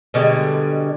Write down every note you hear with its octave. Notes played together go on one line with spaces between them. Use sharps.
B2 D3 G3 G#3